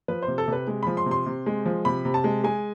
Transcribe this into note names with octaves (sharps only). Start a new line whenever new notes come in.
F3 B4
C5
C3
A4
C3 B4
G#3
F3 B5
C6
C3
C6
C3
G#3
F3
C3 B5
C3
A5
G#3
G#3 G#5